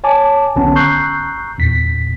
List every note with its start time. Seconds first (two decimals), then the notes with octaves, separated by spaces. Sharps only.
0.04 C#5 G#5 A5 D6
0.56 B1 D3 B3 C#4 A5
0.75 A#5 C#6 E6 F#6 G6 C7
1.58 E2 A#2 B6